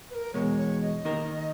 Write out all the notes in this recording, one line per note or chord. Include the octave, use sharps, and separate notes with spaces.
B4
A#4
E2 B2 G#3 C#5
C#5
D#5
D#3 A#3 D#4 A#4